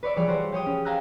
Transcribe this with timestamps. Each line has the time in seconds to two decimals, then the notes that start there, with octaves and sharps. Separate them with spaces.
0.03 B4 C#5 D5 E5
0.16 E3 F3 G3 G#4 C#5 D5
0.27 G3 F#4 A4 C5 C#5
0.52 G4 G#4 C#5 G5 D#6
0.66 C#4
0.85 F5 G5 G#5 A#5 E6 F#6